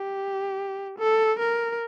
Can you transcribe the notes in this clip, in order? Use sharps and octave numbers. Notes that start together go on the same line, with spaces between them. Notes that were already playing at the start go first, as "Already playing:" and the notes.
Already playing: G4
A4
A#4